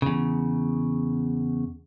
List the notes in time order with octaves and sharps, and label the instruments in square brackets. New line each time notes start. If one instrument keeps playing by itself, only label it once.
[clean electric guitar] E2 C#3